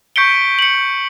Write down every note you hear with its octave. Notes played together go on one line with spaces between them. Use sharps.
C#6 G6 B6 C#7 D7 G7
C#7 F#7